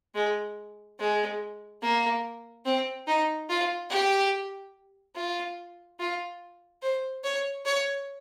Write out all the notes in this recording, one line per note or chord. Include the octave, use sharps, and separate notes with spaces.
G#3
G#3
A#3
C4
D#4
F4
G4
F4
F4
C5
C#5
C#5